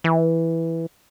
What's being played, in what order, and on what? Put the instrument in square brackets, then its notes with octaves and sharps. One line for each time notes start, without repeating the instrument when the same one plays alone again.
[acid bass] E3